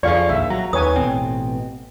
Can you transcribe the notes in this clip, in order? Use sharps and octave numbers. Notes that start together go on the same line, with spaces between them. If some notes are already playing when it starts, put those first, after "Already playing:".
F2 E3 F3 G#4 D5 F5 C#6
A#1 D#2 E5
F#3 A#5
D#2 B4 C#5 G#5 D#6
A1 B2 C4